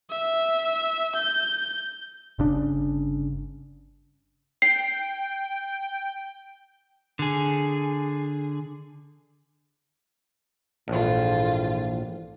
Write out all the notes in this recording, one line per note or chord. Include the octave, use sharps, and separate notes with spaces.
E5
G6
G1 C#3 D4
G5 C7
D3 G#4
A#1 G#2 D3 E3 F4